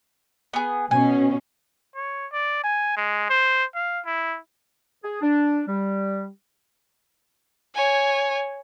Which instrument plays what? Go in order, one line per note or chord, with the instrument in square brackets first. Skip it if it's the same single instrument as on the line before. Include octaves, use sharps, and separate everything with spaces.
[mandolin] B3 G#4
[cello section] B2 C#4 [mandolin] G#5
[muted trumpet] C#5
D5
G#5
G#3
C5
F5
E4
[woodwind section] G#4
D4
G3
[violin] C#5 G#5